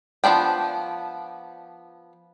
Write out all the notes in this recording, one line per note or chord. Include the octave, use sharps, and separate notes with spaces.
F3 B3 D4 G5